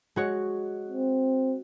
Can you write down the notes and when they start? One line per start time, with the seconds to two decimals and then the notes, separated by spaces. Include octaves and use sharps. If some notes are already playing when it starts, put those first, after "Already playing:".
0.16 G#3 F#4 C#5
0.89 C4